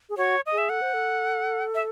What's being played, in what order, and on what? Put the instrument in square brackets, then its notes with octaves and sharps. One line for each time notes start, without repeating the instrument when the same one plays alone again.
[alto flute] G#4
[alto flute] F#4 [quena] C#5
[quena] D#5
[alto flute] G#4
[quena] E5
[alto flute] A4 [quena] F#5
[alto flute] C5
A4
[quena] E5